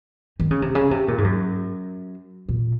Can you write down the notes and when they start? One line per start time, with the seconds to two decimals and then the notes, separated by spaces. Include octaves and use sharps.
0.40 D#3
0.51 C#3
0.62 C3
0.75 C#3
0.91 C3
1.08 A#2
1.18 G#2
1.24 F#2
2.49 A#2